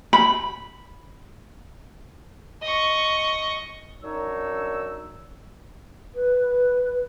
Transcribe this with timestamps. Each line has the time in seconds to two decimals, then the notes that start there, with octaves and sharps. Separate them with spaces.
0.13 B5
2.62 D#5 C#6
4.01 F#2 D4 D#4 C#5 E6
6.15 B4